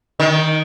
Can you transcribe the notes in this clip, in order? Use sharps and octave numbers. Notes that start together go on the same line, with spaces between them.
D#3